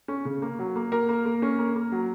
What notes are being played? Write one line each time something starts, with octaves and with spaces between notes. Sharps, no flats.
C#4
C#3
A#3
F#3
A#3
A#3 A#4
A#3
A#3
C#4
A#3
A#3
F#3